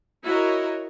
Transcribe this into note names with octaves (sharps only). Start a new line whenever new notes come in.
E4 F#4 A#4 C#5 D#5